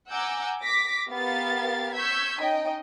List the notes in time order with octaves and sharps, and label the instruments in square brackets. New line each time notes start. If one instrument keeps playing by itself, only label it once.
[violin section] F#5 G#5 A#5 D6 E6 G6
D6 A#6 B6
B3 G4 A#4 F5 A6
C#6 E6 G6 G#6 B6
C#4 D#4 D#5 G5